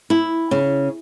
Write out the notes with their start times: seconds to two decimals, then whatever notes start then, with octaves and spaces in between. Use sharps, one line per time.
0.10 E4
0.51 C#3